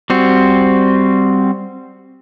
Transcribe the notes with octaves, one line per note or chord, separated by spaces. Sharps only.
G3 C4 F#4